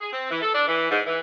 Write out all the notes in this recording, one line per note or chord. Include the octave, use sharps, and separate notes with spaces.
G#4
C4
E3
A4
D4
E3
G#2
E3